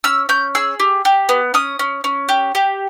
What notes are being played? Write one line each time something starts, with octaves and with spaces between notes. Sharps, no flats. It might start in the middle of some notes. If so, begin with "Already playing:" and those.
C#4 E6
C#4 G6
G#4 E6
G4
G4
B3
C#4 D#6
C#4
C#4
G4
G4